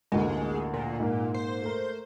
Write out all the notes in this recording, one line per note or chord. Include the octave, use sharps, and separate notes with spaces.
A1 D2 G#3 A#3
A#2
G#2 A#3
C5
A3 A#4